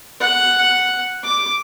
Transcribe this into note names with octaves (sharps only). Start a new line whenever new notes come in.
F#5
D6